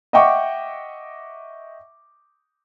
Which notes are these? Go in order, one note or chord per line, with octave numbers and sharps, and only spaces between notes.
D#5 E5 F#5 G5 C#6 D6